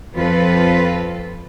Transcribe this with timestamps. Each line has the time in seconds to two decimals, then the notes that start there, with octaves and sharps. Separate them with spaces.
0.14 F2 F3 C4 F4 A4 B4